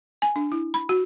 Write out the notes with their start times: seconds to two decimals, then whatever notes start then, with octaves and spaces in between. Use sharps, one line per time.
0.22 G#5
0.36 D4
0.52 E4
0.74 B5
0.89 F#4